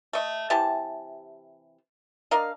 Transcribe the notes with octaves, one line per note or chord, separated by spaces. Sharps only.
A3 D#5
C3 E3 G4 A5
D4 A#4 D#5 F5